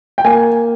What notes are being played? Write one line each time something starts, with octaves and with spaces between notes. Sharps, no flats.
G5
A#3 G#5